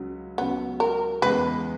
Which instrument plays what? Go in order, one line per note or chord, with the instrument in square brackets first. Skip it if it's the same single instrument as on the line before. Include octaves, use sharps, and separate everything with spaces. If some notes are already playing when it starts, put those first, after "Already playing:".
Already playing: [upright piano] C#2 C#3 F#3
[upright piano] C#2 C#3 F#3 [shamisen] B3
[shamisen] A#4
[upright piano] E2 C#3 G#3 B3 [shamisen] B4